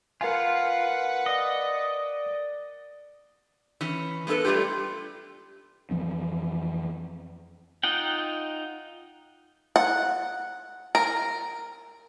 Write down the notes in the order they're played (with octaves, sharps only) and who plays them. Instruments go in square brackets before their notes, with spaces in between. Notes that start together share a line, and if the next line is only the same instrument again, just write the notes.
[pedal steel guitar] F4 [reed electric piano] A#4 F5 G#5 [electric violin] B4 F#5
[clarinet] D5 [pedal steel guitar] D#5
[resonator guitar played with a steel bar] E3 C#4
G#3 B3 E4 A4 B4
G3 A3 D4 F4 G4
[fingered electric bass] F2 E3 F3 C4
[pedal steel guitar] D#4 F4 F#5 G5
[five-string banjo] F#5
A#4